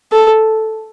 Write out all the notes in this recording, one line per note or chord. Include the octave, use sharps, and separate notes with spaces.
A4